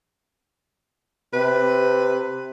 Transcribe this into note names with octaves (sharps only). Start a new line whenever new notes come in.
C3 B4